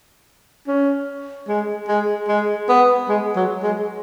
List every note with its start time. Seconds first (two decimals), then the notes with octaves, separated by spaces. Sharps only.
0.68 C#4
1.48 G#3
1.88 G#3
2.28 G#3
2.69 B3
3.09 G#3
3.36 F#3
3.63 G#3